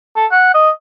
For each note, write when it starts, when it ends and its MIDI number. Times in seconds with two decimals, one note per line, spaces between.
0.16 0.26 69
0.32 0.51 78
0.54 0.70 75